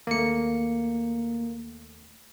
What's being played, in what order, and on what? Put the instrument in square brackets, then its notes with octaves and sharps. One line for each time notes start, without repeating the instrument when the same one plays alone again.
[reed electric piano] D#2 A3 [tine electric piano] A#3 C#7